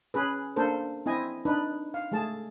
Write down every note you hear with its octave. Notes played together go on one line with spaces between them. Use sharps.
C#4 G#4 B4
A#3 D4 A4 A#4 C5
C4 E4 D#5 G#5
D4 D#4 B4
F5
G#3 A3 G#4 A5